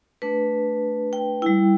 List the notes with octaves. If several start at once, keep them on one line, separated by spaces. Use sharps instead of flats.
A3 D4 B4
G5
G3 E4 G5